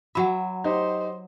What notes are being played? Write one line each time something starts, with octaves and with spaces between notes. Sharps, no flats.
F#3 E5 F#5 B5
D#4 G4 C5